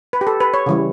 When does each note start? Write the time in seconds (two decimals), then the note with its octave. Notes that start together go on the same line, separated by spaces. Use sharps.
0.13 B4
0.21 G4
0.27 A4
0.40 B4
0.54 C#5
0.66 C#3 E3 G3